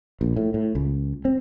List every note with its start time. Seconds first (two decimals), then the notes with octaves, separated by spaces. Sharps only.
0.21 A#1
0.36 A2
0.54 A2
0.75 C#2
1.25 C4